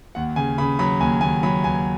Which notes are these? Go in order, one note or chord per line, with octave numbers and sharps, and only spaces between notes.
D#2 F#5
C#3 G#5
C#3 B5
F#3 B5
D#2 G#5
D#2 G#5
F#3 B5
D#2 G#5